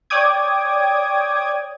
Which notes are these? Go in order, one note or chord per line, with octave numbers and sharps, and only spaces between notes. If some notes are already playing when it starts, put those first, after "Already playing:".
C#5 D5 G5 D6 D#6 G#6